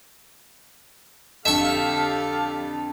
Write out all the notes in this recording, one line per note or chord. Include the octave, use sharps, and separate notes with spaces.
F2 D3 G4 A4 E5 F5 C#6